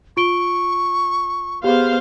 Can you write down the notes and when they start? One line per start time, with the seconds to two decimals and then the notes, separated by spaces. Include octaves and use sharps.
0.17 F4 C#6 D7 G7
1.64 B3 G4 G#4 C5 F5